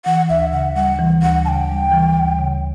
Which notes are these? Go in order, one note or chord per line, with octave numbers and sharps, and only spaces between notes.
E3 F#5
D2 E5
C#3 F#5
G3 F#5
E3
D2 F#5
C#3 G5 A5
G3
E3
D2
C#3